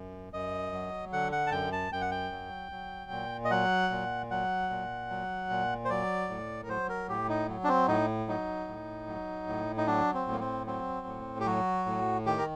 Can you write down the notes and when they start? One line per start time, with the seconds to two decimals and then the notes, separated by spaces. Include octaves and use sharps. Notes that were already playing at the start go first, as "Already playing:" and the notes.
Already playing: F#2
0.33 F#2 D#5
0.72 F#3
1.12 D3 F#5
1.32 F#5
1.47 A5
1.52 F#2 G5
1.72 A5
1.92 F#2 G5
2.01 F#5
2.11 G5
2.32 F#3
2.72 F#3
3.11 A#2
3.45 D#5
3.51 F#3 F#5
3.90 A#2
4.31 F#3 F#5
4.70 A#2
5.10 F#3
5.50 A#2
5.85 C5
5.90 F#3 D5
6.29 A2
6.63 A#4
6.69 F#3 C5
6.89 A#4
7.09 A2 G4
7.29 D#4
7.49 F#3
7.64 D4
7.69 C4
7.88 A2 D#4
8.28 F#3 D#4
8.68 A2
9.07 F#3
9.48 A2
9.78 D#4
9.87 F#3 D4
10.14 C4
10.27 A2
10.32 A#3
10.40 C4
10.66 F#3 C4
11.07 A2
11.40 G4
11.46 F#3 F#4
11.86 A2
12.26 D#3 G4
12.38 A#4